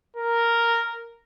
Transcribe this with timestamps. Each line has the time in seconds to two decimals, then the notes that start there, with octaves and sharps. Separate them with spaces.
0.16 A#4